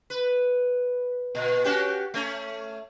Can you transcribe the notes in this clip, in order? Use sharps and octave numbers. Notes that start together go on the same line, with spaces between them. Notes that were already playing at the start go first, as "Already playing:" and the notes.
B4
A#2
C#4 F#4 G4
A3 C#4